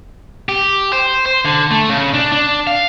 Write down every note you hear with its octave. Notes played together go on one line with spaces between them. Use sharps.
G4
C5
C5
D3
A3
C#3
D4
D4
F5